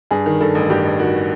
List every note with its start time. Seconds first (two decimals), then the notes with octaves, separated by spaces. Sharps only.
0.11 G2 G#4
0.26 D#3
0.40 G2 A4
0.55 A1
0.70 G2 G4
0.85 A1
0.99 D#3 F#4